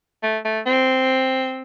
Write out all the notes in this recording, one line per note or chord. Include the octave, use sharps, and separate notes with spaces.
A3
A3
C4